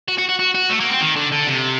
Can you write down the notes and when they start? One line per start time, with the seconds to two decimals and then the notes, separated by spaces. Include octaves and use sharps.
0.08 F#4
0.18 F#4
0.29 F#4
0.39 F#4
0.55 F#4
0.70 A3
0.80 A#3
0.90 C4
1.01 D#3
1.16 D3
1.32 D3
1.47 C3